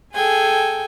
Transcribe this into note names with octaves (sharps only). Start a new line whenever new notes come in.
G#4 A4 G5 G#5